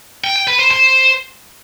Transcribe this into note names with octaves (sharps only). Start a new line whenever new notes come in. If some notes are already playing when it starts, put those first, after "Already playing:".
G5
G5
B4
C5
C5